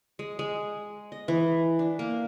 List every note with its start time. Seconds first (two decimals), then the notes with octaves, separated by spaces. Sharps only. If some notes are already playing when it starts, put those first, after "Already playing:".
0.19 G#3
0.39 G#3
1.12 D#5
1.28 E3
1.79 D4
1.99 A#3